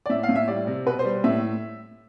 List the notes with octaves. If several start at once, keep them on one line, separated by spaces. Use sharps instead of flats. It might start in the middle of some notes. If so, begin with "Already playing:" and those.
D5
A2 E5
F5
A2
E5
G3 D5
C3
B2 B4
C5
G3
A2 E5